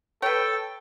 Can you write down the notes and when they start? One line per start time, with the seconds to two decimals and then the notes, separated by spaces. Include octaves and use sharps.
0.22 A4 B4 C#5 G5